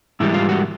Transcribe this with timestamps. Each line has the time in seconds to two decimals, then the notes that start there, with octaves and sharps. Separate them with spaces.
0.20 G#2 E3 G3 E4
0.34 F4
0.49 F#4